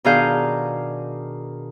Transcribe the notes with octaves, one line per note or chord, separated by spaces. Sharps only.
B2 D#3 D4 G#4 F5 G6